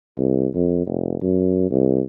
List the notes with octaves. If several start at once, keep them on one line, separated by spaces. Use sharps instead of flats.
C2
F2
F1
F#2
C2